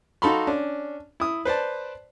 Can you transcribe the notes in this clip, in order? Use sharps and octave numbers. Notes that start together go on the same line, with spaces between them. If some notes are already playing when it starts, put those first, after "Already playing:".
D#4 F#4 A4 F5 B5 C6
C#4 D4
E4 D#6
B4 C5 D5 A5